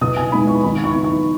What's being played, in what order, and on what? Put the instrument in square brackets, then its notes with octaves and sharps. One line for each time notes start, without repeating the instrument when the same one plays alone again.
[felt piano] B2 D#6
G#5
G#3 B3 D#4 B5
C#6
D#3 B5
C#6
B3 D#4
C#6